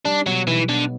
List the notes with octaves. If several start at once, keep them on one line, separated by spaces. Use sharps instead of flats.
G3 D4
B2 F#3
B1 E3
D3 B3